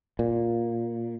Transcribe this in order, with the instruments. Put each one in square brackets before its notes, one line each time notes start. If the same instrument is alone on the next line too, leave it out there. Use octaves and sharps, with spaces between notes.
[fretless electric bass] A#2